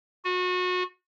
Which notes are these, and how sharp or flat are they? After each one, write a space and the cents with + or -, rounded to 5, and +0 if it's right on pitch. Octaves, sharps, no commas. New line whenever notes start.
F#4 -30